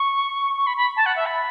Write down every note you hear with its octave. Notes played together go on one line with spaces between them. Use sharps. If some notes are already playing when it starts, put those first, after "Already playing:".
Already playing: C#6
C#6
B5
B5
A5
F#5
E5
B5